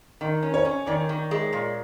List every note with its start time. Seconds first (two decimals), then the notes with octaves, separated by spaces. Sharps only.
0.21 D#3 D#5
0.43 C#4
0.54 C#5
0.65 C#4
0.86 D#3 D5
1.09 D#3
1.31 G#3
1.53 A#2